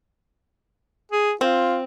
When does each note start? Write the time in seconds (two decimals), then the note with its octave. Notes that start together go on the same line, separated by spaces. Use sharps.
1.12 G#4
1.41 C4 F4